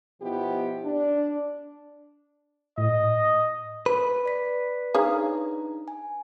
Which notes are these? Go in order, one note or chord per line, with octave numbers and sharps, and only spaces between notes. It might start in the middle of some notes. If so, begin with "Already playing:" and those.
B2 F3 B3 E4 G4
D4
A2 D#5
B4
D5 B6
D4 D#4 G#4 C#5 F5 A#5
G#5